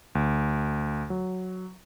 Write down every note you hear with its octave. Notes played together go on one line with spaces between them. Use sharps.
D2
F#3